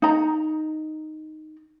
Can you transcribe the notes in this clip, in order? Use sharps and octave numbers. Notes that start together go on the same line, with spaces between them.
D#4 A#5